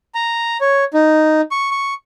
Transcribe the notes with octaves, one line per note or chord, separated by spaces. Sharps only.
A#5
C#5
D#4
C#6
C#6